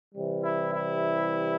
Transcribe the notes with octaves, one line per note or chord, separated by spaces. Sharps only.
C3 E3 G3
E4
E4